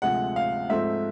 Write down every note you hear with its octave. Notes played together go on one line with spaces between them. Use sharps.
D2 C3 F3 G#3 F#5
F5
G#2 F3 A3 C4 E5